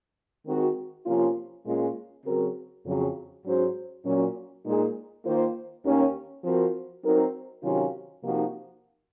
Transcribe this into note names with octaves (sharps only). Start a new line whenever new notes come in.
D#3 G#3 C4 F#4
C3 F3 A#3 C#4 F4
A#2 G#3 C#4 F4
C#3 F#3 C4 F#4 A#4
F2 C#3 F#3
G#2 F#3 C#4 F#4 C5
A#2 F#3 C#4
A#2 G#3 D#4 G#4
D#3 A#3 F4 C5
D#2 D#3 A#3 C#4
F3 C4 F#4 A#4
F#3 C4 D#4 A#4
C3 D#3 F#3 C#4 F4
C3 F3 A#3 D#4 F#4